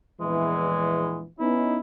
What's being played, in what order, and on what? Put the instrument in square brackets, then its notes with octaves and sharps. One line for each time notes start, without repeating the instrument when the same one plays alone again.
[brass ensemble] A#1 E2 E3 [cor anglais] G#3
[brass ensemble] B3 C#4 D#4 [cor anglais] E4